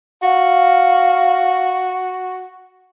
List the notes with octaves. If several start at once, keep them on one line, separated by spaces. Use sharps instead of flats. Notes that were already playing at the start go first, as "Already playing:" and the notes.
F#4 F5